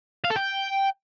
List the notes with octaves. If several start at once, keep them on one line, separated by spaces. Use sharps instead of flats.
F5
A4
G5